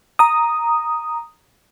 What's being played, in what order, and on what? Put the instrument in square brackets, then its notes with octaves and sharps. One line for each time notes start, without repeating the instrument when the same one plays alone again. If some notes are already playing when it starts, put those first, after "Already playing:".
[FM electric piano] A#5 D#6